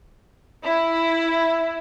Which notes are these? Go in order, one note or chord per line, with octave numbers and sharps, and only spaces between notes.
E4